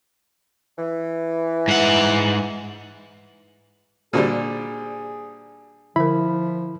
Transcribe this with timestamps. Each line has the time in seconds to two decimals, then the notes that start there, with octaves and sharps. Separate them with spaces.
0.78 E3
1.68 G#2 F#5
4.13 A#2 D3 G3 F#4 G#4 C5
5.96 D3 F3 E4 A#4 B5